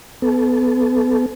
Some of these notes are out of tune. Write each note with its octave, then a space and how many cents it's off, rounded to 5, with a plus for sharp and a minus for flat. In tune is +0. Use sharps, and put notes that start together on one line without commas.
B3 +25 A4 -25